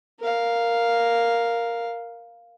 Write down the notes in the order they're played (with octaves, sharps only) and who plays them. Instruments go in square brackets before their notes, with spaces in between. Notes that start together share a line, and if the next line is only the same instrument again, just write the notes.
[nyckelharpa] A#4 F5